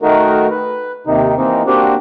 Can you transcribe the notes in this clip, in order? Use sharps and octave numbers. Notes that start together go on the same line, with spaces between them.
D#3 A3 D#4 F#4 A#4
B4
D#2 C3 D#3 D#4
E3 A#3 C4 D#4
A#3 C4 D4 F#4 G4